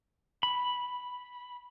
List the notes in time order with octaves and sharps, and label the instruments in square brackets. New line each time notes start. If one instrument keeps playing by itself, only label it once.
[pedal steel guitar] B5